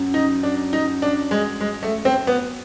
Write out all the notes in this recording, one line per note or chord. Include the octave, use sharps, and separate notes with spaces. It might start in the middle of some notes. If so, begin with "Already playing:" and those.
Already playing: F#2
D#4
D4
D#4
D4
G#3
G#3
A3
C4
B3